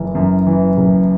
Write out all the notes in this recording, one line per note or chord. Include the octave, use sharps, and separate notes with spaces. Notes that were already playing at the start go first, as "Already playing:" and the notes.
Already playing: F#1 E3
F#2
E3
F#1